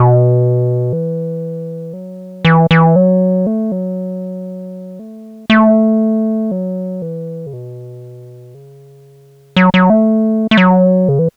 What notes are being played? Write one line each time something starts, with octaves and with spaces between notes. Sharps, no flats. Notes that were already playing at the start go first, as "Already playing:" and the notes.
Already playing: B2
E3
F#3
E3
E3
F#3
A3
F#3
A3
A3
F#3
E3
C#3
B2
C#3
F#3
F#3
A3
A3
F#3
C#3
E3